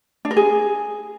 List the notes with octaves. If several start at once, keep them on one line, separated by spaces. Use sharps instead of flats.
D4
A#4
G#4